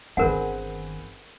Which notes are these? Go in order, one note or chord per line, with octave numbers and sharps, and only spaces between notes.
G1 D#3 C4 G#4 A#4 B4 F#5